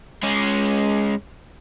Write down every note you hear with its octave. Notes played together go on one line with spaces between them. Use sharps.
G#3 C#4